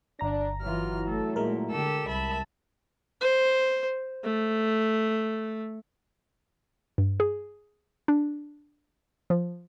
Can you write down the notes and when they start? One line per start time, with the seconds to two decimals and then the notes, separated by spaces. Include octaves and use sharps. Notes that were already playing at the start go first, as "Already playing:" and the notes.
0.19 G1 D4 A#5 A#6
0.62 E3 F#3 E4 F4 F6
1.06 A3 A4
1.36 A#2 G#3 A#4
1.70 D3 G4 A4 E6
2.07 C2 E5 A5 B5
3.21 C5
4.24 A3
6.98 G2
7.20 G#4
8.08 D4
9.30 F3